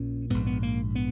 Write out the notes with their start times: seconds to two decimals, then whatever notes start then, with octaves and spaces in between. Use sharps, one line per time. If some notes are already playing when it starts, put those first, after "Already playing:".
Already playing: A#1 A#2 C#4
0.30 A#1 G#2 B3
0.47 B3
0.63 A#3
0.95 B3